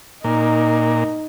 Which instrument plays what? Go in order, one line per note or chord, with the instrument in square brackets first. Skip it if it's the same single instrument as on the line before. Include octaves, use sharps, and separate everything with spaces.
[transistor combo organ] A#2 [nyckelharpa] D#4